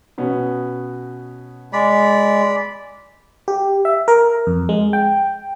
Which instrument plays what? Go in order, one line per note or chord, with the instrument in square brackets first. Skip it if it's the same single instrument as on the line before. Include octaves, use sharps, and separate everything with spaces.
[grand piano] B2 B3 C#4
[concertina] G#3 [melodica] D5 B5
[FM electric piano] G4
E5
A#4
F2
G#3
G5